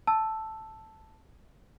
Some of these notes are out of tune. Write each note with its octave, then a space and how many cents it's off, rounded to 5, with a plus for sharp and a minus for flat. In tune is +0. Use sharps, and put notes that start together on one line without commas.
A5 +0 E6 +0